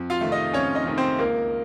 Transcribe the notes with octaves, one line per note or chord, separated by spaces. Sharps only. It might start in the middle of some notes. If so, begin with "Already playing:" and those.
Already playing: F2
F4 F5
C3 D#3 A3
D#4 D#5
F2 C#4 C#5
D#4 D#5
C3 D#3 A3
C4 C5
C#2 A#3 A#4